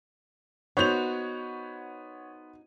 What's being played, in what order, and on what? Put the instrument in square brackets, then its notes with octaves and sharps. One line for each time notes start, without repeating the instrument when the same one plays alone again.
[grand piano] B3 C5 [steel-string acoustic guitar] D#4 F#4 [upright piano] C#5 G6 F7